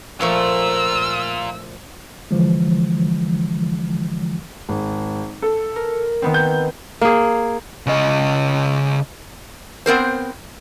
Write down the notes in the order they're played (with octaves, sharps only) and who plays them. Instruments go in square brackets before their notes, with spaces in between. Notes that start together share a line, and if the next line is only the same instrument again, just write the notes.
[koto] A#2 F3 A3 [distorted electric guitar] F4 A#4 [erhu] E6
[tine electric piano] D3 E3 F3 G#3
[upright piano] G#1
A4
[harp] A#4
D#3 B3 C4
[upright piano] G6
[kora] A#3 G#4
[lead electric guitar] C#3 D#5
[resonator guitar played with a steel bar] B3 C4 A#4 C5